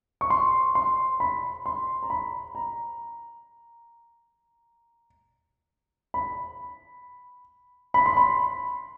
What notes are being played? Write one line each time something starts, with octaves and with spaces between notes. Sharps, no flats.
C#6
C6
C6
B5
C6
A#5
B5
A#5
B5
B5
C6
B5